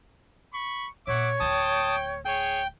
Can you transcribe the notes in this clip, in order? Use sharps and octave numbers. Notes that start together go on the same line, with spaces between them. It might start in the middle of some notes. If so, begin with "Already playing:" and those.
B5 C#6
A#2 B3 C#5 E5 F#5 D6
D1 D2 G5 A5 D#6
G#4 C#5 G5